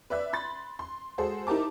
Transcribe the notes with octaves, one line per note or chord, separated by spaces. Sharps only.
B4 D5 E5 F#6
B5 C6 A6
C6
G#3 F#4 G#4 A4 C5
D#4 E4 G4 A#4 A5 D6